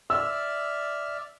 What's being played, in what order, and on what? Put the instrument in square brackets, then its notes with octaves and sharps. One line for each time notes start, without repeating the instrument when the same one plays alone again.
[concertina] D5 E5 F6 [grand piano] E6